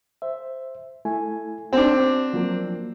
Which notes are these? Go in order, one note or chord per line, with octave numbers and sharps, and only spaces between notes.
C5 E5
A3 E4 G#5
C4 D4 F#4
F3 F#3 A#3